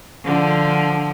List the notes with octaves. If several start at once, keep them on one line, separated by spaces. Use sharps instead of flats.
D3 F3